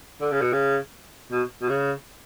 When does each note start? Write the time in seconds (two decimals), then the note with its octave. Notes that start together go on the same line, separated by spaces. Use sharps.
0.21 D3
0.32 C#3
0.41 B2
0.53 C#3
1.31 B2
1.62 B2
1.69 C#3